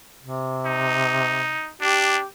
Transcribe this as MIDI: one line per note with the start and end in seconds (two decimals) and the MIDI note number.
0.22 1.59 48
0.66 1.71 63
1.82 2.19 62
1.82 2.26 67